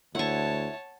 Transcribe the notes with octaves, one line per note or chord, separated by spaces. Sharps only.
D2 E4 C#5 F#5 A5 C#6